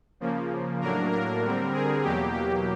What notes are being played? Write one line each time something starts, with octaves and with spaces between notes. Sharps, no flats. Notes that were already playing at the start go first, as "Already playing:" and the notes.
C#3 F3 A#3
A2 F#3 A#3 D4 A#4
A#4
D3 G3 C4
G#4
E2 B2 F#3 A#3 G4
G4